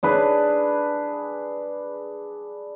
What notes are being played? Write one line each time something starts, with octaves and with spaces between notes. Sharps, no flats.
D4 G#4 B4